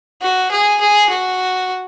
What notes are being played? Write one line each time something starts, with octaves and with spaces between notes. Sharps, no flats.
F#4
G#4
G#4
F#4